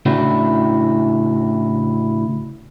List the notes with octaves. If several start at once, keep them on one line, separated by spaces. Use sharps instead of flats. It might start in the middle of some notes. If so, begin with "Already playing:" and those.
A2 C#3 D4 E4 F#4